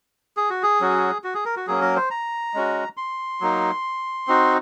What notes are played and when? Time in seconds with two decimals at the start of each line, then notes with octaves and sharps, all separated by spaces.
0.37 G#4
0.50 F#4
0.63 G#4
0.81 F#3 C#4 F#4
1.24 F#4
1.34 G#4
1.45 A#4
1.56 F#4
1.67 F#3 A#3 C#4 G#4
1.81 A#4
1.96 C5
2.11 A#5
2.54 G#3 C#4 F#4
2.97 C6
3.41 F#3 A#3 D#4
4.27 C4 D#4 F#4